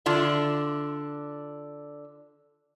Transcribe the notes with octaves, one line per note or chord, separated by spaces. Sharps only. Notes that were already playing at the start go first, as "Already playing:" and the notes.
D3 D4 F4 D5 E5